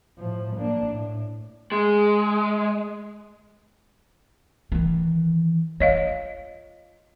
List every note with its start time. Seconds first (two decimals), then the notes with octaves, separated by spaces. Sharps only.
0.19 A2 F3
0.56 A#3 D4
0.92 A2
1.72 G#3
4.72 D#3 E3
5.80 F4 C#5 D#5 F5